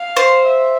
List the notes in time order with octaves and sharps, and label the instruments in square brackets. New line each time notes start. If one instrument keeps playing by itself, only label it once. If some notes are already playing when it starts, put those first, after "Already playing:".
Already playing: [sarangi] F5
[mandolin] C5
[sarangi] E5